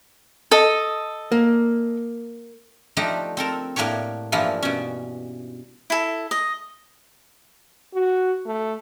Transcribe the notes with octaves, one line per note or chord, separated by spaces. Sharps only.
A4 D#5
A#3
F3 A3 D4 D#4 G4 F5
C4 A4 A#4
A2 A#3 D4 G4 C#5
G2 E3 F3 A#3 E4 F4
B2 C#4
E4 A4
D#5
F#4
A3